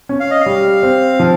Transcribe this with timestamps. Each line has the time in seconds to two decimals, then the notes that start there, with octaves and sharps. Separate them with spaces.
0.09 C#4
0.20 F5
0.31 D#5
0.41 F5
0.46 G3
0.83 C4
1.20 F3